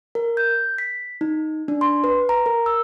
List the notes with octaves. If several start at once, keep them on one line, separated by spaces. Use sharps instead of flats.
A#4
G6
B6
D#4
D4
C6
B4
A#5
A#4
E6